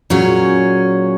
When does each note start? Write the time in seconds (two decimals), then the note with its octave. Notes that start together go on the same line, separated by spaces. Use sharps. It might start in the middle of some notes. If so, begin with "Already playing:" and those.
0.10 A#2 F#3 C#4 G#4 C#5